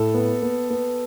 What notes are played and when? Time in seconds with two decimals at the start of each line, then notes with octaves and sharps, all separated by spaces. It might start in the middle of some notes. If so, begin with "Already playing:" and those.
Already playing: A2 A4
0.14 B3
0.43 B3
0.70 B3